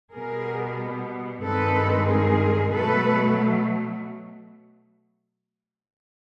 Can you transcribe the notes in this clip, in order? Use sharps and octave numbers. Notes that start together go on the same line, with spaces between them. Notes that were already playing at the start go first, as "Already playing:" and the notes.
B2 G3 B3 G#4 A#4
G2 D#3 G#3 C4 D#4 A4 B4
G#4 A#4
B2 F#3 A3 A4 B4